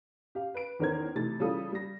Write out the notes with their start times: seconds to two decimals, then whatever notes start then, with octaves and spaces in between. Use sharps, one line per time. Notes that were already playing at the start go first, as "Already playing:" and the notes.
0.35 G4 F5
0.55 B4 D7
0.79 E2 D#3 C#4 A#4 C5 G#6
1.15 C3 E3 A3 D#4 E4 A6
1.40 C#3 E3 G3 F4 A4 D#6
1.72 G3 A#6